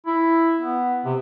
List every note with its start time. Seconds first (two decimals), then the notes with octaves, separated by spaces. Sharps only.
0.06 E4
0.60 B3
1.05 C3